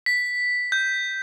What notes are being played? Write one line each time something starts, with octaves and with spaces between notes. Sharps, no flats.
B6
G6